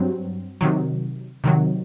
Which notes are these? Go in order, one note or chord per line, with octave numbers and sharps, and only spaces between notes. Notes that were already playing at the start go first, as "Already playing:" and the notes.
Already playing: G2 F#3 C4
C3 D#3 F#3
C3 D#3 F#3